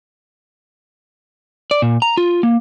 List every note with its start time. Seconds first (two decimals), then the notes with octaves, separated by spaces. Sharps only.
1.71 D5
1.82 A#2
2.02 A#5
2.17 F4
2.43 A#3